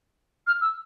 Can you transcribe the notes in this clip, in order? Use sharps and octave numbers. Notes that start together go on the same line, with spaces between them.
F6
E6